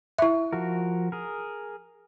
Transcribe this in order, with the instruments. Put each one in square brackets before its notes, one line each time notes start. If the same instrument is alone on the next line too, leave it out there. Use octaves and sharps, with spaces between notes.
[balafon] E4 E5
[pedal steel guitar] F3 F#4 A#4
G#4 A#4